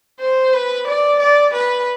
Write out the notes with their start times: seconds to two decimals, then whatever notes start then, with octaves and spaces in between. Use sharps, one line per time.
0.20 C5
0.53 B4
0.88 D5
1.20 D5
1.54 B4